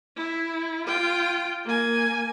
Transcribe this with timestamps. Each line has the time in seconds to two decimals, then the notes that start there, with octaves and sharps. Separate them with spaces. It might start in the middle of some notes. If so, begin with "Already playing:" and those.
0.16 E4
0.86 F4 G5
1.65 A#3 G#5